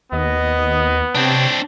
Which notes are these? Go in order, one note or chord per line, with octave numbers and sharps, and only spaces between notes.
D#2 B3 D#5
C3 C4 D4 C#5 G5 A5